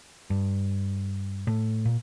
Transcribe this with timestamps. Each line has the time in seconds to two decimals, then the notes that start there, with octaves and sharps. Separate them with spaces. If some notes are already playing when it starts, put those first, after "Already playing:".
0.30 G2
1.47 A2
1.85 A#2